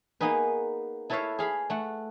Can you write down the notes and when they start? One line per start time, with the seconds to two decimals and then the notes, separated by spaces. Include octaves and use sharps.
0.21 A#3 B3 D#4 G#4 B4
1.10 E4 A4 B4 C#5 E5 F5
1.39 G#4 F5 B5
1.70 A3 F#5